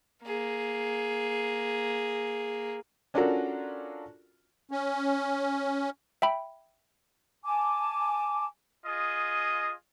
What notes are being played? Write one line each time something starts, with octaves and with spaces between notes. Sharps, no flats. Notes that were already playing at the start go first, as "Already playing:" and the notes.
A#3 G#4
C#4 D4 F4 F#4 A4 A#4
C#4
E5 G5 B5
G#5 A5 D6
F4 G#4 D#5